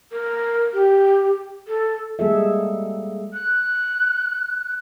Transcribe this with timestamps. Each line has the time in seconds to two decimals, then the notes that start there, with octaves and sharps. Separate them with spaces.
0.12 A#4
0.74 G4
1.68 A4
2.19 G3 G#3 A#3 G#4 A4 E5
3.34 F#6